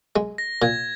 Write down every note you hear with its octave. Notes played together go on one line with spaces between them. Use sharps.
G#3
A#6
A#2 G#6